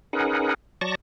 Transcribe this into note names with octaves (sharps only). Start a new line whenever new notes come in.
C#4 D#4 G#4 A#4 B4 F#5
F#3 D5 A5 C#6 A#6